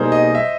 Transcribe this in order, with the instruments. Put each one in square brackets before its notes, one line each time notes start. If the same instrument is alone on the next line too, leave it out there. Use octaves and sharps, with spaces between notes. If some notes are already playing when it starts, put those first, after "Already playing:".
Already playing: [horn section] B2 G3 A#3 D#4 G#4 [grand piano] C5
[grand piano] D#5
E5